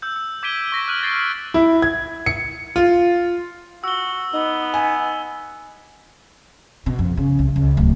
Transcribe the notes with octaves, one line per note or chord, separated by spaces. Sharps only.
E6 G6
E6
D6 G#6 B6 D7 D#7 G7
C#6 A#6 B6
F6 F#6 D#7 F#7
G6 A6 C7 D7
E4
G#6
C#7
F4
F#4 E6 G7
B3 D#4
G#5
B2
F2
C#3
C2
C#2
D1